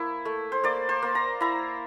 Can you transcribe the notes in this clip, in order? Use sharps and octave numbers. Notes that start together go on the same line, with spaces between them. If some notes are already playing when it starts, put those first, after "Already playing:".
Already playing: A#3 E4
A3
C5
A#3 D5
C5
A#3
A#5
E4 A#5